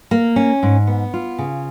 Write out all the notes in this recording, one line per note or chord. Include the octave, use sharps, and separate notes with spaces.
A#3
C#4
G#2
B3
F4
C#3